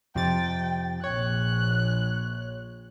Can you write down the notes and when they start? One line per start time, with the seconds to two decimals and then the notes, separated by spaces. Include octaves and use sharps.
0.15 F2 C3 G5 A6
1.04 A#1 C#5 F#6